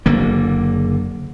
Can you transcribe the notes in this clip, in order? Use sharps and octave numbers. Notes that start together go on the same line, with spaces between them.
F#1 D3 A#3